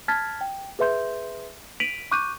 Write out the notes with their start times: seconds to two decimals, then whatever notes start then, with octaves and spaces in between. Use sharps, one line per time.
0.08 A5 F6 G#6 A6 B6
0.41 G5
0.79 G#4 B4 E5 C6 G6
1.80 B6 D7 D#7 F7 F#7
2.11 C#6 D6 F#6 G6 D#7